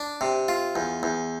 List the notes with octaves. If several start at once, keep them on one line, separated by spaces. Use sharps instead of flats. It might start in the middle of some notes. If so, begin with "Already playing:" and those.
Already playing: D4
C3
F4
E2
E2